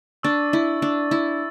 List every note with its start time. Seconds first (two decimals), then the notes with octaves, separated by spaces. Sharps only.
0.23 D4 C#6 E6 A6
0.53 E4
0.82 D4
1.11 E4